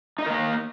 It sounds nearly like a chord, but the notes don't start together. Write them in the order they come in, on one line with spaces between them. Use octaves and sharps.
D#4 D#5 A#4 A#3